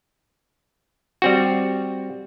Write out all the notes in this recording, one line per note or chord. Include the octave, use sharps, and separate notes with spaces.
G3 C4 F#4